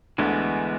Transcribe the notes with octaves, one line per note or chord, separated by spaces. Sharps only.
D2 D3 E3 G#3 B3